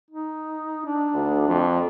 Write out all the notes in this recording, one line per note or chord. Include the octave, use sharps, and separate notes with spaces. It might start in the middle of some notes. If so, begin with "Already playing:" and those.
D#4
D4
D2
F2